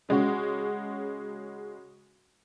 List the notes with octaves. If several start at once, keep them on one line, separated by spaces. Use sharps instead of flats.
C#3 G#3 C#4 F#4